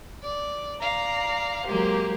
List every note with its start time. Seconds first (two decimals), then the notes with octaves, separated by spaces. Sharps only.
0.23 D5
0.80 D5 F5 A#5
1.65 F#3 G#3 A#3 G4 C5